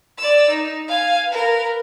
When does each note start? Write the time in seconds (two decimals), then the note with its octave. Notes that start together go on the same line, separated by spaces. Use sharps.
0.18 D5 E6
0.50 D#4
0.88 F5 G#5
1.28 A#4 B4